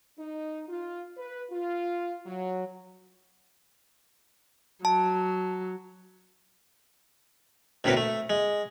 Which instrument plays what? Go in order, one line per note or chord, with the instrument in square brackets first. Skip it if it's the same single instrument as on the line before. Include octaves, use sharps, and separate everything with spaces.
[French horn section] D#4
F4
B4
F4
F#3
[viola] F#3 [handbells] A5
[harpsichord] D2 A2 C3 A#3 B4
A3
G#3